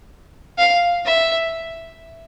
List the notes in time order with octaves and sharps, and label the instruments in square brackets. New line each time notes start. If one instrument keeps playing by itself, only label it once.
[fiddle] F5
E5